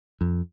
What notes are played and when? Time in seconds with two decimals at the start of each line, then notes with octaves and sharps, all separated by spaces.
0.21 F2